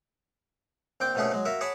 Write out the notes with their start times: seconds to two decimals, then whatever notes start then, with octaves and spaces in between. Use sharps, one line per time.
1.00 A#1 C4 G5 D6
1.15 A#1 B2 A3 C#4 D4 G#4
1.31 F#3 G#3
1.45 A#3 F#4 A#4 E5
1.61 G#4 C#5 D5 F#5 A5 B5